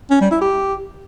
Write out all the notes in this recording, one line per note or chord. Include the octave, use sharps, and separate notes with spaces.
C#4
G3
E4
G4